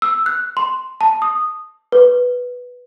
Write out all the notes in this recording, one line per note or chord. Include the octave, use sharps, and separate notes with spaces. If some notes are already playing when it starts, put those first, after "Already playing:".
E6
F#6
C6
A5
D#6
B4